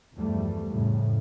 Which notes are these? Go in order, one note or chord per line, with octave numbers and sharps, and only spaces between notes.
E2 G2 F3 G3 A3
F2 A2 C#3